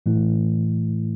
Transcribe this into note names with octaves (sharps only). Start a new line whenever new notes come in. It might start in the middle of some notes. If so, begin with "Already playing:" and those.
A2 E3 A3 E4